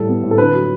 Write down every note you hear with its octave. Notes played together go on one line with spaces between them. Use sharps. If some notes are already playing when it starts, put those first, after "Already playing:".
Already playing: A2 G3 A4
B3
A2
A4
D3 B4
F#3